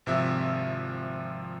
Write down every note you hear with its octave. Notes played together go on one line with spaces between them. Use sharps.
G#1 C3 F3 E5 E6